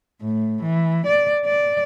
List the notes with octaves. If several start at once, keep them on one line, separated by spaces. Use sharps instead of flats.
A2
E3
D5
D5